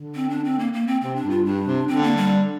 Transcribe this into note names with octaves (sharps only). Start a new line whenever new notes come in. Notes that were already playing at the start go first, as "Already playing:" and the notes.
Already playing: D3
C4
D4
C4
A#3
A#3
C4
C3 C4
D4
G2
F4
G2 D4
C3
D3 C4
A#3
G3